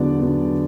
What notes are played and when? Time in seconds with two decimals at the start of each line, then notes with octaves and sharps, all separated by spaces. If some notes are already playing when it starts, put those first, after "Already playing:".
Already playing: E2 D3 F#3 B3 D5
0.19 D3 F#3 B3